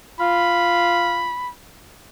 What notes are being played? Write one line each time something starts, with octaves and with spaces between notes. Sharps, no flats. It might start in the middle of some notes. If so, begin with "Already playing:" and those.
F4 B5